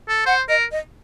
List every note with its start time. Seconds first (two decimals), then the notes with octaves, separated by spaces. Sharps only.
0.09 A4
0.26 C5 F#5
0.49 A#4 D#5
0.71 D#5